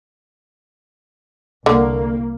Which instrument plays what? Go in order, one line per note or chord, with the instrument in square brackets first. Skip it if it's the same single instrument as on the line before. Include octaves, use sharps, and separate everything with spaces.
[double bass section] C2 A#3 [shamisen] D3